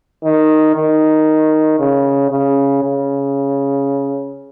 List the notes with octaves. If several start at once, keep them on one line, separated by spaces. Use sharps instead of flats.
D#3
D#3
C#3
C#3
C#3